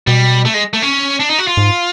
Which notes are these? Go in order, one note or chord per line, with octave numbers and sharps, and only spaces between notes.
B2 G3
A3
G#3
A3
C#4
D4
D#4
F#4
F4
G#2